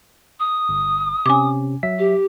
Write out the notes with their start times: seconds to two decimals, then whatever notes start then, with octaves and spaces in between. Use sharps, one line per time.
0.40 D#6
0.69 G1
1.26 C3 C#4 G#5 D6
1.83 F#3 E5 B6
1.98 G4